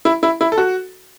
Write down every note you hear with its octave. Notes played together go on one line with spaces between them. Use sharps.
E4
E4
E4
A4
F#4